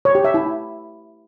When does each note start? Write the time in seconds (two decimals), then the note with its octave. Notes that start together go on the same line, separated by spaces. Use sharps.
0.05 C#5
0.15 G4
0.25 E5
0.34 E4